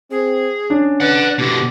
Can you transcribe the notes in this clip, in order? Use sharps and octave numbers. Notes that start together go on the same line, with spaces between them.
C4 G#4
C#4 D4
B4 D5 F#5
B2 D3 E3 G4